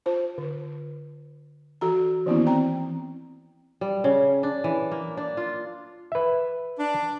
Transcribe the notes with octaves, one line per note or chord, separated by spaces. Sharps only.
F4 C5 A5
D3
E3 F#4 A4 A#5
D#3 E3 A#3 B3 C#4 E4
C4 G5 A#5
G3
C#3
D4
E3
A#3
D4
F4
B4 E5
D4